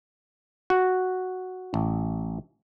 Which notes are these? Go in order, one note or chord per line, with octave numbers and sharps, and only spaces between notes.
F#4
A1